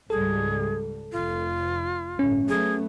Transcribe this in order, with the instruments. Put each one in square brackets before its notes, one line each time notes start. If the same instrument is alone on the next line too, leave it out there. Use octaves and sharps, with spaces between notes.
[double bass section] C#2 G#2 G3 [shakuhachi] G#4 [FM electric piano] A4
[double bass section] F1 [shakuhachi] F4
[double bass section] G1 A2 [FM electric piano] C#4
[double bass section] F#3 A3 B3 [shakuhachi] G#4